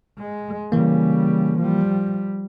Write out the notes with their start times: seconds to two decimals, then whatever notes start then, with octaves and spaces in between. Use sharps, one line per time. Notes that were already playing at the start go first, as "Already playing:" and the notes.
0.19 G#3
0.72 C#3 E3 G3 A#3
1.59 F3 G3